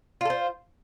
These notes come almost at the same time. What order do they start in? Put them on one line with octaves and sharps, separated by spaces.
F4 A4 C5